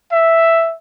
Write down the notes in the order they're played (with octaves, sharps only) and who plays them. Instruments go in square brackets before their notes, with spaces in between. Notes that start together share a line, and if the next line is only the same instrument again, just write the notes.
[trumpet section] E5